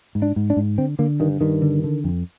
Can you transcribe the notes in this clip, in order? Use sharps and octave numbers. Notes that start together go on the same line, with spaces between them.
G#2
D4
G#2
D4
G#2
D3 C4
D3 A#3
G2 D#3
G2 D#3
D3
D3
F2